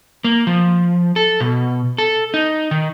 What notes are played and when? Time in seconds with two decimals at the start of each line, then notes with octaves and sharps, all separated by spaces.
0.24 A#3
0.47 F3
1.16 A4
1.40 B2
1.98 A4
2.34 D#4
2.71 D#3